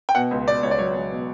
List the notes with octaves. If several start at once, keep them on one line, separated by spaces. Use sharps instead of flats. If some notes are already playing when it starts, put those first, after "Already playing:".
G5
B2 F#5
C#2
B2 D5
C#2 C#5
D5
F#3 C#5
C#2
B2